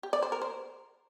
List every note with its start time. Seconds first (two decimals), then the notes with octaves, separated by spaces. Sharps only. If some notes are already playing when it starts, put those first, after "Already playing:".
0.03 G4
0.13 D5
0.22 C5
0.32 A#4
0.42 C5